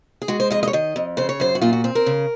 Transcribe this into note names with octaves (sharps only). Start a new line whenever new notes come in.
G#4
G#3 F#4
C5
F2 D#5
D#5
C#5
D#3 D#5
F2
C#3 C5
C#5
F#2 C5
F#4
A#2 F4
F#4
C4
A#4
C#3